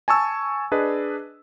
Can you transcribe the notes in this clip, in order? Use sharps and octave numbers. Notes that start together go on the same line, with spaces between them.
G#5 A5 C#6 E6
D4 G#4 B4 D#5